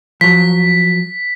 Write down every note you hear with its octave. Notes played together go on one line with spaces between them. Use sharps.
F3 F#3 B6